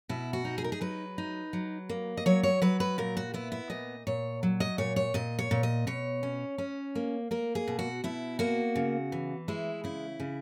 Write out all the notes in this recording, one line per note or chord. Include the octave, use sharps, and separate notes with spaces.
B2 E4
F#4
D#4
G#4
A#4
G#4
F#3 B4
D#4
F#3
A#3
D#5
F#3 C#5
C#5
F#3 B4
B4
A#2 A#4
F#4
B3 E4
E4
A#2 D#5
A#2 C#5
F#3
D#5
A#2 C#5
C#5
A#2 D#5
C#5
A#2
D#5
B2 C#5
C#4
C#4
A#3
A#3 A#4
G#4
B2
F#4
B2 E4
A#3 F#4
C#3
E3
G#3 E4
C#3 E4
C#3